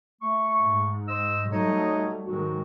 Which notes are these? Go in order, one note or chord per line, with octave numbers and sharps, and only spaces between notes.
A3 C#6
G#2
C5 D#5 E6
F#3 G3 A3 D#4 C#5 D#5
G#2 D#3 F#3 G#3 F#4